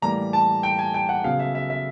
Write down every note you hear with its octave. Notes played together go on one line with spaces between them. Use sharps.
A2 E3 G3 A#3 A#5
A5
G5
G#5
G5
F#5
C#3 F#3 B3 F5
E5
E5
E5